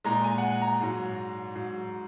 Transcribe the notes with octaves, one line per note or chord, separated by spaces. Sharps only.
A#2 G#3 A#5
G#5
F#5
G#5
A#5
G#2 F#3
G#2 F#3